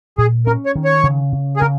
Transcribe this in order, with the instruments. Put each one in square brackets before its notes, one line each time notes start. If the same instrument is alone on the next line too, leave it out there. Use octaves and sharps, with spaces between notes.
[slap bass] A#2 [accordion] G#4
[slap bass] C#4 [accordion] A#4
[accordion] C#5
[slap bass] D#3
[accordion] C#5
[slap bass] C#3
C#3
[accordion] G#4
[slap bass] C#3 [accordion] A#4